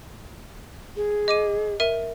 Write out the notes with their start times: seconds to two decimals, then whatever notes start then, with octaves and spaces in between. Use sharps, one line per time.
0.96 G#4
1.28 D#5 D6 D#7
1.80 A#4 E5 D#7